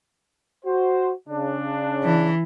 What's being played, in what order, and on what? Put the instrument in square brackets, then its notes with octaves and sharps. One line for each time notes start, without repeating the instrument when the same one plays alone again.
[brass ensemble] F#4 C5
C#3 D4
[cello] E3